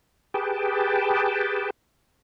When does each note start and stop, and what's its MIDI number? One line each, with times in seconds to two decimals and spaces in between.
0.34 1.70 67
0.34 1.70 68
0.34 1.70 71
0.34 1.70 79
0.34 1.70 81